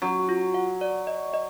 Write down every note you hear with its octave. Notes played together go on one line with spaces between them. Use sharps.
F#3 C#4
F4
F#5
D5
D#5
D#5